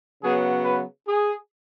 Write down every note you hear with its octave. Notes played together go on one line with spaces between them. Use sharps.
C#3 F#3 B3 G#4
B4
G#4